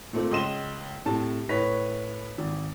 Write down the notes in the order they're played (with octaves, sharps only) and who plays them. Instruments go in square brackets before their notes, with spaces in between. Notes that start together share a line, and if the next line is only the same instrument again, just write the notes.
[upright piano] A#2 A3 C4
C#2 D#5 C6 E7 G7
A2 C3 A5
A2 B4 C#5 B6
G#1